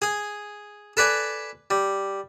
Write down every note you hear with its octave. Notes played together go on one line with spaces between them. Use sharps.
G#4 G#5
A4 B4 D5 G#5
G3